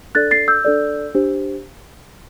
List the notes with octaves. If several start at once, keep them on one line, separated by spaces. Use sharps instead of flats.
D4 A4 D5 F#6 A6
A6 C7
E6 G6
D4 A4 D5
D4 G4 C5